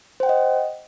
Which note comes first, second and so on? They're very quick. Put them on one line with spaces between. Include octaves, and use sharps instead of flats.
C5 G5 F#5 D#5